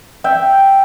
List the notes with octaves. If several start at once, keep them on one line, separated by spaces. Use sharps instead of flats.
E5 G5